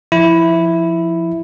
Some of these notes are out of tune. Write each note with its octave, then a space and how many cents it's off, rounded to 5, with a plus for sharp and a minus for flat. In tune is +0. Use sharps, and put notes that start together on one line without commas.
F3 -15 E4 +0